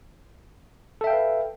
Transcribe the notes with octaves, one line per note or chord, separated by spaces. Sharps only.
A4 B4 E5 F5 G5